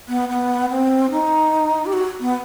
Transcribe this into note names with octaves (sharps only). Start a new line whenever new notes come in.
B3
B3
C4
D#4
G4
F#4
B3